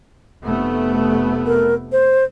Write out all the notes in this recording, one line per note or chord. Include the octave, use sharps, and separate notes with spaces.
F1 A3 B3
A#4
C5